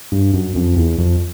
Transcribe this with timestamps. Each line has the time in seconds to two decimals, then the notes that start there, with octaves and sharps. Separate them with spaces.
0.12 G2
0.33 F#2
0.55 F2
0.77 E2
0.98 F2